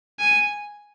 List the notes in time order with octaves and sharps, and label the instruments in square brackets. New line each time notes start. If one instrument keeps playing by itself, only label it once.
[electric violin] G#5